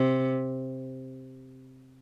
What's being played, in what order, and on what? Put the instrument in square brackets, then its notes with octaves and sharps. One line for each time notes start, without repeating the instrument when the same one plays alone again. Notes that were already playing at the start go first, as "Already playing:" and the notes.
Already playing: [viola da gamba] C3